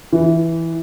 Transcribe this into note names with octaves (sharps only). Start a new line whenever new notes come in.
E3